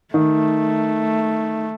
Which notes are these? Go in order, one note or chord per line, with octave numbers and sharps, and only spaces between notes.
D#3 A3